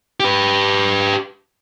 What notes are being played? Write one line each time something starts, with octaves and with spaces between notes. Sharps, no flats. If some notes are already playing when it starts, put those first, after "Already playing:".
G4 B4